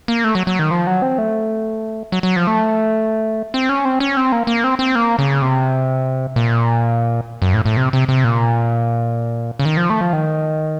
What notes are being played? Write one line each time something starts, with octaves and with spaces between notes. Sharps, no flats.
A#3
A3
F#3
F#3
D#3
F3
F#3
C4
A3
F#3
F#3
F3
A3
C4
C#4
C4
C#4
C4
A#3
A#3
C4
C4
A#3
C#3
C3
A#2
F#2
A2
A2
C3
C3
C3
A#2
C#3
D#3
F3
A3
F3
D#3